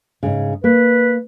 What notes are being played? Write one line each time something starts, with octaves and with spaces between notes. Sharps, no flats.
G#2 C#3
A#3 B4